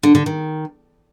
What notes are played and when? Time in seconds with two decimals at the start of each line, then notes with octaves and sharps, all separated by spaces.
0.03 D3
0.15 D3
0.26 D#3